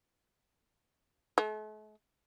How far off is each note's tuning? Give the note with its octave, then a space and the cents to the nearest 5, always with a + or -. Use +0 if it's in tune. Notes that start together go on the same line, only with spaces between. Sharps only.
A3 -45